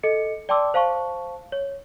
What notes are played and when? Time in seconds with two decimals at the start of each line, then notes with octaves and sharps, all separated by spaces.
0.03 A4 D#5 C#7
0.49 D5 G5 A5 C6 D6 E6
0.74 C5 F5 A5 C#6
1.52 C#5